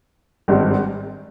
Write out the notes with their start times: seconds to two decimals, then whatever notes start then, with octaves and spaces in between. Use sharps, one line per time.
0.48 G#1 G2 D#3 G#3 C4